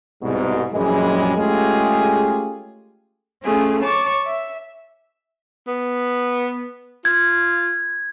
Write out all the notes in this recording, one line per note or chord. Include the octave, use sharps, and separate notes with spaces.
C2 G#2 B2
A#1 F#2 E3 G3 G#3
G#3 A3 C#4 F4 G4 G#4
A3 C#4 F4 G#4
C#5 A5 C#6 D6
E5
B3
F4 G#6